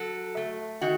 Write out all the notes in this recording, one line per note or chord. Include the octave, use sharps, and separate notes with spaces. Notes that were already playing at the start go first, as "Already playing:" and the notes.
Already playing: F#3 A4
A3
D#3 F#4